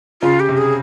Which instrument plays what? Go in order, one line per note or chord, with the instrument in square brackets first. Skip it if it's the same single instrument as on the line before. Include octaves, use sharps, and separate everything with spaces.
[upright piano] C#3 [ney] F4
[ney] G4
[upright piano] C3
[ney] G#4